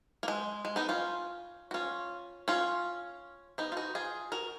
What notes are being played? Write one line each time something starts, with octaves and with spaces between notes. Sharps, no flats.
A#3
G#3
G#3
B3 D#4
C#4 F4
F#4
C#4 F4
C#4 F4
B3 D#4
F4
D#4 F#4
F4 G#4
F#4 A#4